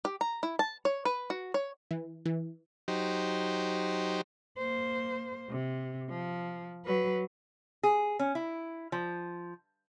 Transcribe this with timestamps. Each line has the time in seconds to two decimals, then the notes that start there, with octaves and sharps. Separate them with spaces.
0.05 G4
0.21 A#5
0.43 E4
0.59 A5
0.85 C#5
1.05 B4
1.30 F#4
1.54 C#5
1.91 E3
2.26 E3
2.88 F#3 D#4 G4 C5
4.57 A#3 C5
5.50 C3
6.09 F3
6.85 F#3 B4
7.83 G#4
8.19 C#4
8.35 E4
8.92 F3